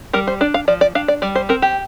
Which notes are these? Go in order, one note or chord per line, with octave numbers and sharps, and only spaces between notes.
G3 A#4
C5
D4 D5
F5
F3 D5
D5
D4 F5
D5
G3 D5
C5
C4 A#4
G4